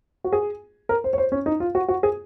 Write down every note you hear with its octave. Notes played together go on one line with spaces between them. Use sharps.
F#4
G#4
A#4
C5
C#5
C5
C#4
D#4
F4
F#4
F#4
G#4